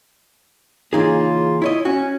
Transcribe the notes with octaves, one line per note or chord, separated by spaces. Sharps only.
C#3 E3 A#3 D#4 F4 G#4
E4 C#5 D#5
C#4 F#4